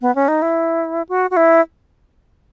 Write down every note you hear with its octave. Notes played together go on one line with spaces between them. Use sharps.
B3
C#4
D#4
E4
F#4
F#4
E4